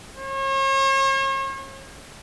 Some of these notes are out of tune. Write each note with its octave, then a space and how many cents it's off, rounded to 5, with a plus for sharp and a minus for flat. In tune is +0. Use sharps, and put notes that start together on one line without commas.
C#5 -40